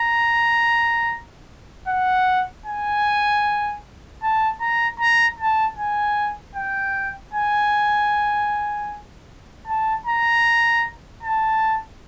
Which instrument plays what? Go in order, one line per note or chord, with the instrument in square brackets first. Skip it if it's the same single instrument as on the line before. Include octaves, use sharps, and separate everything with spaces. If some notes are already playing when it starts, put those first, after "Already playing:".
Already playing: [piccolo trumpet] A#5
F#5
G#5
A5
A#5
A#5
A5
G#5
G5
G#5
A5
A#5
A5